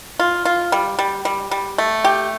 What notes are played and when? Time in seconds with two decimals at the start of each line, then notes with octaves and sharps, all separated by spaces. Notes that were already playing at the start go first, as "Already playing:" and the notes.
0.19 F4
0.45 F4
0.72 G3
0.99 G3
1.25 G3
1.51 G3
1.78 A3
2.04 G4